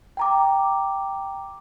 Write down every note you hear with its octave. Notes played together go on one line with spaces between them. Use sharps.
G5 A#5 D6